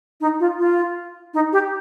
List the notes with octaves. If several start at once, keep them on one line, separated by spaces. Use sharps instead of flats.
D#4
F4
F4
D#4
G4